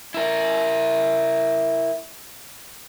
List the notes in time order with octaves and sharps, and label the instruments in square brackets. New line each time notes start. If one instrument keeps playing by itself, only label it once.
[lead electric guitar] E4 A#4